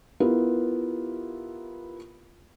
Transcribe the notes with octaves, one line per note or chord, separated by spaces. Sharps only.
B3 E4 F4 G4 A#4